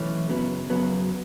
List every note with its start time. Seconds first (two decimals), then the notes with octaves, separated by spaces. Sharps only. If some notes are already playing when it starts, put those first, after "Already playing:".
Already playing: B1 A2 E3 A3 C#4
0.29 F#2 C#3 F#3 B3
0.70 F#2 C#3 F#3 B3